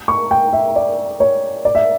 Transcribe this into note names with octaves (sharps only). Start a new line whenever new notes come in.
C#6
G5
E5
D5
C#5
D5
E5